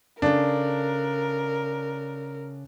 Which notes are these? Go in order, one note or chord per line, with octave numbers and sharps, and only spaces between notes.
C#3 D4 A4 A#4